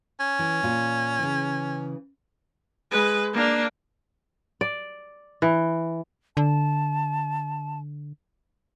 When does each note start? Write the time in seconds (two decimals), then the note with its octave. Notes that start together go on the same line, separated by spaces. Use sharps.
0.20 C#4
0.39 E3
0.63 A#2 F4
1.19 C#3 E3
2.91 G#3 B4
3.34 A#3 D4
4.61 D5
5.42 E3
6.37 D3 A5